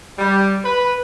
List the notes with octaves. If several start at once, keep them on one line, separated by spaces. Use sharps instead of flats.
G3
B4